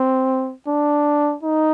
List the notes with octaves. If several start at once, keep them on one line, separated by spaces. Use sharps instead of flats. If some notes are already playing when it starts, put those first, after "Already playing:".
Already playing: C4
D4
D#4